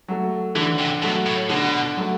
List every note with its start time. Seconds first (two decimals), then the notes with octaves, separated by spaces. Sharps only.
0.08 F#3 A3
0.55 D3 E3
0.79 C3
1.03 B2 F#3 A3
1.26 A2
1.50 B2 D3
1.97 F#3 A3